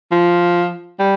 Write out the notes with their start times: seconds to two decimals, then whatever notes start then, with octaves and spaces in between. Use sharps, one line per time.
0.12 F3
1.00 G3